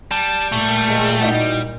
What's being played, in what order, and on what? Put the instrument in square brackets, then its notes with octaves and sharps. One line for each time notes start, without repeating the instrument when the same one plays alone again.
[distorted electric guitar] G3 [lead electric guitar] A5
[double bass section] A#2 [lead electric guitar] A3
[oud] D#2 G#3 G#4
D#4 E4 F#4